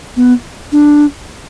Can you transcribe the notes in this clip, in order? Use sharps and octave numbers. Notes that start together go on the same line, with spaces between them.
B3
D4